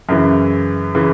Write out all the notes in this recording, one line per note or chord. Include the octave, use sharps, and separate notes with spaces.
F#2 C#3 E3
C#3 E3